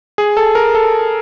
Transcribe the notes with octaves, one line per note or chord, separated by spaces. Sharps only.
G#4
A4
A#4
A4